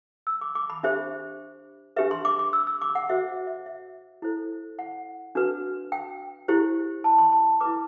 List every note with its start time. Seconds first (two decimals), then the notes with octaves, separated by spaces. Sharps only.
0.27 E6
0.41 D6
0.55 D6
0.70 B5
0.83 D4 G4 C5 E5
1.96 D4 G4 B4 E5
2.11 C6
2.25 D6
2.39 D6
2.53 E6
2.67 E6
2.81 D6
2.95 F#5
3.09 F#4 C5 E5
3.47 E5
3.66 E5
4.22 E4 A4 C5
4.79 F#5
5.35 D4 F#4 B4
5.92 G5
6.48 E4 G4 C5
7.04 A5
7.18 C6
7.32 A5
7.61 E4 B4 D6